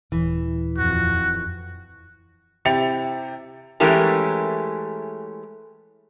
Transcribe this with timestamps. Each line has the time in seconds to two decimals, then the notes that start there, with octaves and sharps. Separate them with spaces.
0.12 D#1 E3
0.78 F2 F#4
2.65 C3 E4 G4 A6 C#7 F7
3.80 E3 G#3 A3 C#4 G4 A#4